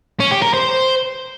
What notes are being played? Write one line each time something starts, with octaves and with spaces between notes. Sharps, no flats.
C#4
G4
A#4
C5